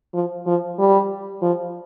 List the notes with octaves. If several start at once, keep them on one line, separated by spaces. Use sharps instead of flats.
F3
F3
G3
F3